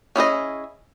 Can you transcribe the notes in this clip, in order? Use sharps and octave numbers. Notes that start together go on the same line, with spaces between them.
C#4 E4 G#4 D#5